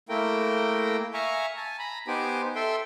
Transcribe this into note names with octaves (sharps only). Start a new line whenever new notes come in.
A3 A#3 E4 A#4 G5
E5 F5 G#5 A#5 C#6
G#5 A5
A#5 B5
B3 D#4 G4 C5 G#5 D6
A4 E5 G5 C6